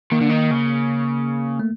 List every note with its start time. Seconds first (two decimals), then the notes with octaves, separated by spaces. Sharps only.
0.12 D#3 A#3
0.21 D3
0.29 D#3
0.51 C#3
1.59 A3